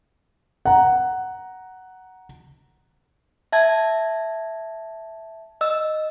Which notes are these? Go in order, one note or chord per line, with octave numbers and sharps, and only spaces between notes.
F#5 A#5
E5 A5 G#6
D#5 E6